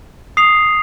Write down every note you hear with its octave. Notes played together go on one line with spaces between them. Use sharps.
D#6 C7 F7